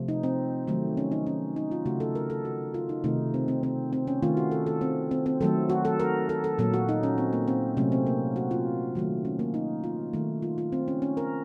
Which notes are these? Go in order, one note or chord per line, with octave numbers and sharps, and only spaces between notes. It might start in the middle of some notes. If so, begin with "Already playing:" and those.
Already playing: C3 F3 A3
D#4
C4
D#3 F#3 A3
C#4
D#4
C#4
D#4
F4
C#3 A3 F#4
A4
A#4
A4
F#4
F4
D#4
C3 D#3 A3 D#4
C4
C4
C4
C4
C#4
D#3 A3 F4
F#4
A4
A4
C4
C4
C4
D#3 F#3 A3 A4
F#4
A4
A#4
A4
A4
A#2 F#3 A#3 A4
F#4
D#4
C#4
C4
A#3
C4
C3 F#3 A3 C#4
C4
A#3
F#4
F4
D#3 F#3 A3
C#4
A#3
D#4
F4
D#3 A3
F4
F4
C4
C#4
C#4
A#4